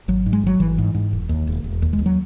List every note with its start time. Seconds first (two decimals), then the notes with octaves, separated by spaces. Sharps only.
0.08 G#1 F#3
0.26 G#2
0.33 G#3
0.43 G#1 F#3
0.60 G#1 E3
0.78 G#2
0.94 G#2
1.13 E1
1.29 D#2
1.47 E1
1.64 E1
1.82 D#2
1.93 G#3
1.99 D#2
2.06 F#3